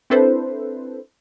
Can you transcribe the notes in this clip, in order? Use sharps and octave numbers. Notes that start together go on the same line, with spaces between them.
C4 D4 E4 A4 B4 C5